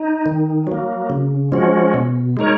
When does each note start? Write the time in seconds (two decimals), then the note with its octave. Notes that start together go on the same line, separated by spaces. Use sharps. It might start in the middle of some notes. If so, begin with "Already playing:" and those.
Already playing: D#4
0.26 D#3
0.67 F#3 A#3
1.10 C#3
1.52 F3 G#3 C#4 F#4
1.94 B2
2.37 G#3 D#4 A#4 C#5